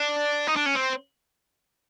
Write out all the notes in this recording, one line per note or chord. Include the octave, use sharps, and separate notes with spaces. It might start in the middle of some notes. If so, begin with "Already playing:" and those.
Already playing: D4
D#4
D4
C#4
C4